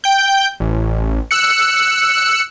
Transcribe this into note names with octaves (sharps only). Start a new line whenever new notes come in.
G5 G6
A1
E6 F#6 C#7